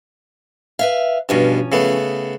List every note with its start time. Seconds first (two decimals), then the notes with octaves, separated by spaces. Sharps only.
0.79 B4 E5 F5
1.29 E2 G2 B2 F3 C#4
1.72 C#3 A3 B3